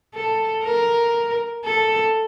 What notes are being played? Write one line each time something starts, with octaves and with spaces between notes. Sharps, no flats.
A4
A#4
A4